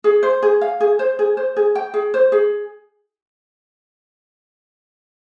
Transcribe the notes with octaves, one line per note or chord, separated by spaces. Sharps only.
G#4
C5
G#4
F5
G#4
C5
G#4
C5
G#4
G5
G#4
C5
G#4